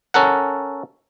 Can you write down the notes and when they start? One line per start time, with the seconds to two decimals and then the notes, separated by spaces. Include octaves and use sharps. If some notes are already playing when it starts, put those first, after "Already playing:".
0.14 C#4 A4 A#4 F#5